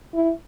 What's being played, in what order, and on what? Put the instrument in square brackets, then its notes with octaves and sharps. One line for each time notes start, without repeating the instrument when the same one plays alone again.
[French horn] E4